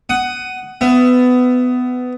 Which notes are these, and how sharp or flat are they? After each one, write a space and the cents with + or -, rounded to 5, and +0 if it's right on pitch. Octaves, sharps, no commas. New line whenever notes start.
F#5 +15 D#6 +0
B3 +20 E5 +25